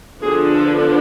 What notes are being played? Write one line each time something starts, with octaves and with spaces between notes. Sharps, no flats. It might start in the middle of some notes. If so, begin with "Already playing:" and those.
D3 F3 B3 D4 G#4
A4